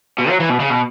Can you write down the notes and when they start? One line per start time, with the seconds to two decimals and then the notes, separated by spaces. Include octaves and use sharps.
0.19 B2
0.29 F#3
0.40 E3
0.50 B2
0.60 C#3
0.70 B2